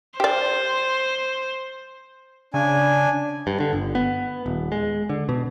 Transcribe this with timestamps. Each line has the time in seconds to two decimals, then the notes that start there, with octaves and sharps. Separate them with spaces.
0.20 G4 C5 D5
2.54 C#3 D4 G#5
3.47 G2
3.60 D3
3.73 G1
3.95 B3
4.46 D#1
4.72 G#3
5.10 D3
5.29 B2